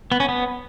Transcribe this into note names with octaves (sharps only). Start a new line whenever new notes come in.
B3
C#4
B3